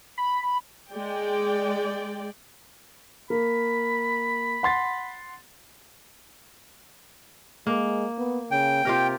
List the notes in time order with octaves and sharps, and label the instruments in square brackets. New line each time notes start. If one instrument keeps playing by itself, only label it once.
[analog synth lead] B5
[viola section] G#3 D5 G5
[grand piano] A#3 [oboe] B5
[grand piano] F#5 C6 A6
[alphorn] G#3 [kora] A#3
[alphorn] B3
[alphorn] C#3 [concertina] G5
[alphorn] C3 [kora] F4 G4 A#4